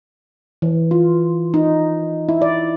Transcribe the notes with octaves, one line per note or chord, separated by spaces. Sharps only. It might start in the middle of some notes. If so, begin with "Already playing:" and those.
E3
F4
D#4
E4
D5